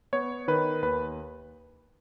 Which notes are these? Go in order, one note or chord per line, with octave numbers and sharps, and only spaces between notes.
B3 C#5
D#3 B4
D#2 B4